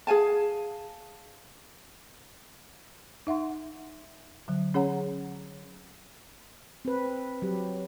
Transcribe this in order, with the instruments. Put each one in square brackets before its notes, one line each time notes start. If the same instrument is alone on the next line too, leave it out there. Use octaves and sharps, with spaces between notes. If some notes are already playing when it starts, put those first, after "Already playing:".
[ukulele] G#4 F5 G#5 A5
[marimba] D#4 E5 F#5 C6
D3 F#3
C#4 G#4 C#5 F#5 A#5
[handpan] C4 B4
F#3 G4